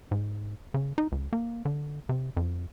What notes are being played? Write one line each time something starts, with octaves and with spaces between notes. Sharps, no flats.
G#2
C#3
D#4
C#2
A#3
D3
C3
F2